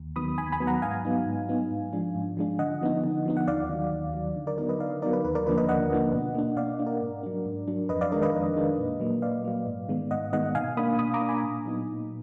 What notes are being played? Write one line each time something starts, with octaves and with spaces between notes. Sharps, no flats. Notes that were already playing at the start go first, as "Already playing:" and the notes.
Already playing: D#2
D#3 F#3 B3 B5 D#6
D#2 G#5 B5
G#5 B5
D#3 F#3 B3
F#5 A#5
G#2 F5 G#5
F#3 B3 D#4
G#2
F#3 B3 D#4
G#2
F3 G#3 D4
G#2
F3 G#3 D4
D3 D#5 F#5
F3 B3 D#4
D3
F3 B3 D#4
F#5
D#2 D5 F5
D#3 F#3
D#2
D#3 F#3
D3
A#4 D5
F#3 B3 D#4 A#4 D5
B4 D#5
D3 D5 F5
F#3 B3 D#4 A#4 D5
B4
D#2 B4
A#4 D5
D3 F3 A#3 D4 B4
B4 D#5
D#2 D#5 F#5
D3 F3 A#3 D4
B2
A#3 D4
B2 D5 F5
A#3 D4
A#4 D5
G#2
F#3 D4
G#2
F#3 D4
F2 B4 D#5
D5 F5
D#3 G#3 D4 A#4 D5
B4 D#5
F2
D#3 G#3 D4
A#2
F#3 A#3
A#2 D5 F5
F#3 A#3
G#2
D#3 G#3 B3
G#2 D#5 F#5
D#3 G#3 B3 D#5 F#5
B2 F5 G#5
A#3 D4 B5 D#6
B2 B5 D#6
A#5 D6
A#3 D4
G#5 B5
A#2
F#3 B3 D#4
A#2